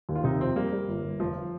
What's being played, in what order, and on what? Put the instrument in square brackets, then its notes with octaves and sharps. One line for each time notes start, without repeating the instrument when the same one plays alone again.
[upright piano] D#2
[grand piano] F4
[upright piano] C3 [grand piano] D#4
[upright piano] F2 [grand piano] C4
[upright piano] G3 [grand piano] A#3
[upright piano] G3
G1
G1
[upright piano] F1 [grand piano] F3